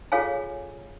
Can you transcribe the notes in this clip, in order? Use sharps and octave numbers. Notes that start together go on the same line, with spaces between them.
F4 G#4 A4 C#5 F5 G#5